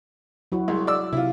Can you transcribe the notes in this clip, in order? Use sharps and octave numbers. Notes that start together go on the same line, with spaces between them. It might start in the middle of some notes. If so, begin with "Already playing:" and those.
F#3 E4 F#4
C2 G#3
D5 E6
C3 E4 F4